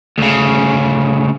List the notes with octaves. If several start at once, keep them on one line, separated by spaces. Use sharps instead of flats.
D2 C#3